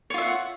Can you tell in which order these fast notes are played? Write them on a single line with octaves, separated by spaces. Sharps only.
C#5 F4 E5 F#5